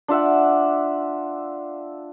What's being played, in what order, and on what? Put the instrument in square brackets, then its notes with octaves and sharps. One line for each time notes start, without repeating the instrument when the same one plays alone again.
[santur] D4 F4 E5 F#5